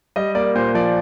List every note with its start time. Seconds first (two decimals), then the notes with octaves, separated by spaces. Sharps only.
0.16 G3 D#5
0.35 A#3 D5
0.55 A#2 C5
0.74 F3 D5